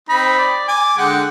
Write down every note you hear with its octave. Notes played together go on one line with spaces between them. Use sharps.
C4 D#4 B5
D5
G#5 D6
D3 G#3 F#5 G5